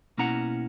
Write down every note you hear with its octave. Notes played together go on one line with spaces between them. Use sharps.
B2 A#3 C#4 E4 F#5 A#5